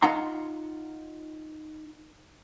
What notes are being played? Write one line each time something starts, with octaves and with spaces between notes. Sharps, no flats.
D#4 F4 F5 F#5 A#5 C6